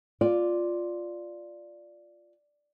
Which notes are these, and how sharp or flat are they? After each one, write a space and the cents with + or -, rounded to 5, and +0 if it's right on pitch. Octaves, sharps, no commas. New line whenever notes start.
F4 +0 D5 +0